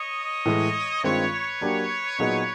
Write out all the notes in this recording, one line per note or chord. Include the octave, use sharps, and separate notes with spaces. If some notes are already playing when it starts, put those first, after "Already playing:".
Already playing: C#5 D#5
A2 E3 G#3
G2 D#3 G#3 C4 F4 B4 C#5
F#3 A#3 D4 G4
A#2 F#3 B3 D#4 G#4